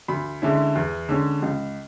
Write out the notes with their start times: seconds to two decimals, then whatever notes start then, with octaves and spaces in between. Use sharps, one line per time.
0.08 D2 B5
0.42 D3 G#3 C#4 E4
0.75 E2
1.09 D3 G#3 C#4
1.43 C#2